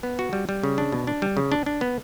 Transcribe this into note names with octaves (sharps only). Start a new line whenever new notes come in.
B3
F#4
G3
G3
C#3
D4
B2
D4
G3
C#3
D4
D4
B3